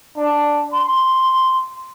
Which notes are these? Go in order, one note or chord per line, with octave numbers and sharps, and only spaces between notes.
D4
C6